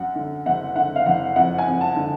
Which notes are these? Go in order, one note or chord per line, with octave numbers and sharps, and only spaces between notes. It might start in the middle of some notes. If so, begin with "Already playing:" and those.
Already playing: F#2 F#5
D3
F#1 F#5
D3 F#5
F5
F#1 F#5
F2 F#5
G#5
F2
A5
D3